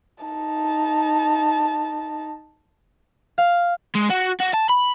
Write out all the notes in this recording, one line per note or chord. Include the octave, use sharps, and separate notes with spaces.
D#4 A5
F5
G#3
F#4
F#4
A5
B5